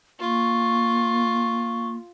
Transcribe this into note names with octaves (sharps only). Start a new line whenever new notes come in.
A#3 F4 C#6